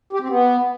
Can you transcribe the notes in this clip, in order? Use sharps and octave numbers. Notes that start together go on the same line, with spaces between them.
G4
C4
B3